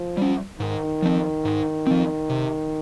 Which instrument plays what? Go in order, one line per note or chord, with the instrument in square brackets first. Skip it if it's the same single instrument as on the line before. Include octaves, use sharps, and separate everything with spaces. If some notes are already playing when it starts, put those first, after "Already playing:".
Already playing: [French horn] F3
[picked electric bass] G3 C#4
[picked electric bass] G#2 [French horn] D#3
[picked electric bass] F3 C4
G#2
F3 C4
C3